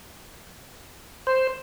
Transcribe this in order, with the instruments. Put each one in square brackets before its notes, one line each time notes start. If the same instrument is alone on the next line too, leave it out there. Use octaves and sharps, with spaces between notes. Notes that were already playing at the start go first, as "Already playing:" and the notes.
[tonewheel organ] C5